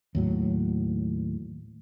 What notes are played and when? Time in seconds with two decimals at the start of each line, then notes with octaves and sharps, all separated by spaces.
0.15 D#2 A2 F#3